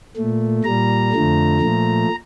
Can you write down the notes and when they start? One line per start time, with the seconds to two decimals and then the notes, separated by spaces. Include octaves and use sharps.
0.16 A#2 A3
0.64 A#2 G3 A#5
1.12 F2 D3 F3 A3
1.60 A#2 F3 A3